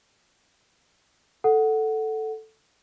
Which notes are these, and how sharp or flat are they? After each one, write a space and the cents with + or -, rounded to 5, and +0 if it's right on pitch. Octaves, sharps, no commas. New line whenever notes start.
A4 +0 F#5 +0